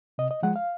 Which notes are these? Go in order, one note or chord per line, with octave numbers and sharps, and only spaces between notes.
C3 D#5
D#5
F3 G#3 F#5
F5